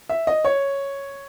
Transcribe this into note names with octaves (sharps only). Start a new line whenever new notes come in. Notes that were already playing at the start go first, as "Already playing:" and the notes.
E5
D#5
C#5